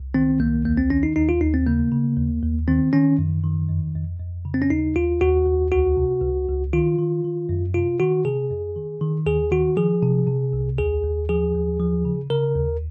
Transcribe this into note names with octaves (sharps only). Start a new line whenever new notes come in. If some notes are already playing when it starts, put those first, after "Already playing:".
Already playing: C2
D#3 C4
C2 A#3
D#2 A#3
C4
D#3 C#4
D#4
D#2 D#4
F4
D#2 D#4
C4
C#3 A#3
C#3
D#2
D#2
D#3 C4
D#3 C#4
F#2
D#3
F2
F2
F2
C#3
C4
C#4
D#2 D#4
D#2 F4
D#2 F#4
D#2
C#2 F#4
C3
C#2
C#2
D#3 F4
D#3
D#3
F#2
C3 F4
D#3 F#4
C3 G#4
F2
D#3
D#3
D#2 G#4
D#3 F#4
F3 G#4
C3
C3
C2
D#2 G#4
D#2
F3 G#4
D#2
F3
C#3
C#3 A#4
D#2